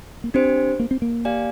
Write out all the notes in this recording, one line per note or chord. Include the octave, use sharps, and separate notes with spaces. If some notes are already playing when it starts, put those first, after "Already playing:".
A#3
C4 D4 G4 C5
A#3
C4
A#3
G4 D5 F5 G#5